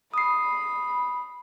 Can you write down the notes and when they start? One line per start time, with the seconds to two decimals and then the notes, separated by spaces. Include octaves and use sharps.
0.14 B5 D#6 C7